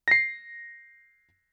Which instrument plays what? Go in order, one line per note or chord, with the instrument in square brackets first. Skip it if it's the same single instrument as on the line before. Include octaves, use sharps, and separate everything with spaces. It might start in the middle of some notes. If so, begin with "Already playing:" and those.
[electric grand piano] A#6 C7